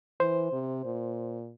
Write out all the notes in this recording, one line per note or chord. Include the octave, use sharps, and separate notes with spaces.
E3 C5
C3
A#2